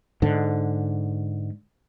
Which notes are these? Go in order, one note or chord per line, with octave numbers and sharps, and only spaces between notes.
G#2 D3